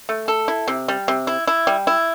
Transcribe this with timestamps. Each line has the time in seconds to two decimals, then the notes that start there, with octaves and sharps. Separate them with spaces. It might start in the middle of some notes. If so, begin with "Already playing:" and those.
0.09 A3
0.28 A4
0.48 E4
0.68 C3
0.88 G3
1.08 C3
1.27 E4
1.47 E4
1.67 G3
1.87 E4